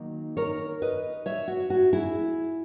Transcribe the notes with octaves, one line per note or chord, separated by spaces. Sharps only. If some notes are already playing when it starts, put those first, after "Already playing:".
Already playing: D#3 F#3 A#3 D#4
A#4 C#5
B4 D#5
C#5 E5
F#4
F#4
E4 G#4